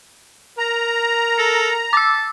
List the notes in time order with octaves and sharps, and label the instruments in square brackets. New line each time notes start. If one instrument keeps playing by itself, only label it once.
[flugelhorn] A#4 [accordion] A#5
[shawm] A4
[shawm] A5 [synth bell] D6 E6